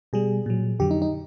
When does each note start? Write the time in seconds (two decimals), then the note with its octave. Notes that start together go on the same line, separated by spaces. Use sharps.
0.13 B2 G3 G#4
0.46 A#2 F#3
0.79 F2 D3 F#3 G4
0.91 D#4
1.02 D#4